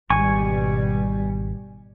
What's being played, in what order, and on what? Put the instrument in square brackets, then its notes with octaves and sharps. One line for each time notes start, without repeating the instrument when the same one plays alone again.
[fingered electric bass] G#1 [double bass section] B2 G3 [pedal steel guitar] G#5 C#6